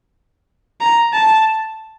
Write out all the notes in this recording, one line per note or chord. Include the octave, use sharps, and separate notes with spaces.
A#5
A5